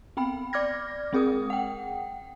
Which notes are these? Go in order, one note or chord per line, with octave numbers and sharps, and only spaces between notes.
B3 C4 G5 B5
D5 D6 F6 G#6 A#6
G#3 C4 G#4 A#4 D#6
F#5 G5